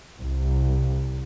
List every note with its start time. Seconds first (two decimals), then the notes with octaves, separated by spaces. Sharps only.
0.19 C2